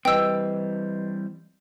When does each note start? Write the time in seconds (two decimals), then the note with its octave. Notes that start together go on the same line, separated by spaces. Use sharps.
0.05 E3 G3 C4 B4 D#5 G5 E6